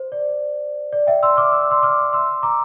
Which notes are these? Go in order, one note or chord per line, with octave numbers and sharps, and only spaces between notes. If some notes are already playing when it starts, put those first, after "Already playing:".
Already playing: C5
D5
D5
E5 G5
C6 E6
D6 F6
E6
D6
C6 E6
D6 F6
C6 E6
A#5 D6